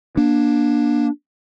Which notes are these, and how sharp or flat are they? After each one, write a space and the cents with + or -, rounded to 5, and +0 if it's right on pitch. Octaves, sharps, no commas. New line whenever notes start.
A#3 +30 D4 +0